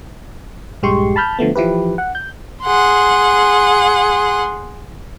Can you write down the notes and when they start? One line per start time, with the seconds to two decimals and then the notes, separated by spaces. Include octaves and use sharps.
0.83 A#1 G2 G#3 G4 C6 C#6
1.16 A5 B5 F6 G6
1.39 D3 F3 A3 B3
1.56 E3 F3 E4 G4 B4
1.98 F#5
2.15 G6
2.62 G#4 F#5 C6